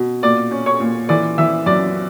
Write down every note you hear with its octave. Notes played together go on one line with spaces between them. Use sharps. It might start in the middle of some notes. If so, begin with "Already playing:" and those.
Already playing: B2
A#2 D5 D6
C#4
C#5 C#6
A#2
E3 D5 D6
E3 E5 E6
F#2 D5 D6